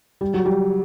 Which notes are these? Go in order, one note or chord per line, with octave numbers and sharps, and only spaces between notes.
G3
F#3
G3